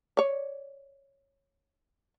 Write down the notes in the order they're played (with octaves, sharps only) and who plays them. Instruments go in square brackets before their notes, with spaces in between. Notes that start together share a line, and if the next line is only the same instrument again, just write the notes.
[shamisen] C#5 D5